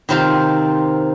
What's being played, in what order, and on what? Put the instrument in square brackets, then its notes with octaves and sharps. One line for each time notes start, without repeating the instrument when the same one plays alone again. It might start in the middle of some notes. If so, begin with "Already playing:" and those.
[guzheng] C3 D#3 C4 F4 F5